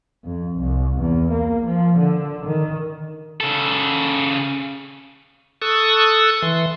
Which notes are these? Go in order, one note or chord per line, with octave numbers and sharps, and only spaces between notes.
F2
C2
E2
A#3
F3
D3
D#3
C#3 A4
A4 C#6 D#6 E6 F#6
E3 C6